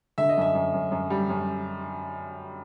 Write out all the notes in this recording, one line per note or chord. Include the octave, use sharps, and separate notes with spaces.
D3 E5
D#5
F#2 E5
F#2
F#2
F#2
G3
F#2